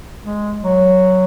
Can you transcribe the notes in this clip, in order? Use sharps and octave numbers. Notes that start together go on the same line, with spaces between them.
G#3
F#3